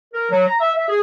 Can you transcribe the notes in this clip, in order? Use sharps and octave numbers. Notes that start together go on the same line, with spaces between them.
A#4
F#3
A#5
E5
E5
G#4